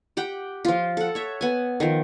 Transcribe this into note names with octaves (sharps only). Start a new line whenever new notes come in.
G4 F#5 G5
F3 F4
A4 F#5
C#5 E5
B3 G#5
D#3 F3